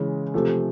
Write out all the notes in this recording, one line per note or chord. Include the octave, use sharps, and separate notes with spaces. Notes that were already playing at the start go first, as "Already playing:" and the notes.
Already playing: C#3 E3 G#3
C3 F3 A3